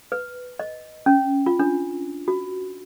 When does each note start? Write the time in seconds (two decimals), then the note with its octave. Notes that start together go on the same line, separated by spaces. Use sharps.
0.12 B4
0.59 D#5
1.06 C#4
1.46 F4
1.59 D4
2.28 F#4